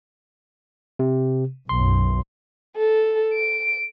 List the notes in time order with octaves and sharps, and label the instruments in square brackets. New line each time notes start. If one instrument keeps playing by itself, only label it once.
[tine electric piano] C3
[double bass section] B1 F#2 [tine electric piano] C6
[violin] A4
D7